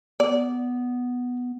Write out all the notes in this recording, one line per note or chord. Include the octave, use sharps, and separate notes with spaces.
B3 D5